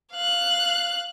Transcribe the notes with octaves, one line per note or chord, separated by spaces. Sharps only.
F5 F#6